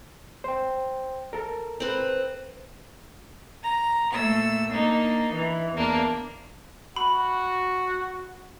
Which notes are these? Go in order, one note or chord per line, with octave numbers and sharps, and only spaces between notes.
C5 G5
A4 A#4
C4 B4
A#5
A#2 A3 E6
A#3 D4 D#4
E3
E2 A#3 D4
F#4 B5